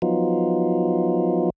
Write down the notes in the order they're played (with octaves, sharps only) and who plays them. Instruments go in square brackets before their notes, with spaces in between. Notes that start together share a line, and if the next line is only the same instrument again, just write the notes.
[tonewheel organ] F3 F#3 B3 D#4 F4